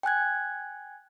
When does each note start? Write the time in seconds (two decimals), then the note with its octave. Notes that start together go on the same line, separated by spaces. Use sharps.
0.03 G5 G#5 F#6 G#6